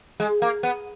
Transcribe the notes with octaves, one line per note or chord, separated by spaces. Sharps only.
G#3
A#3
B3